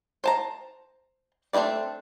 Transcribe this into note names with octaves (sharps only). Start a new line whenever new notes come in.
C5 A5 A#5
A3 C4 D4 E4 D5